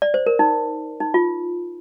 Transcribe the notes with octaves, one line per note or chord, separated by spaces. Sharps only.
D5
C5
A#4
D#4
D#4
F4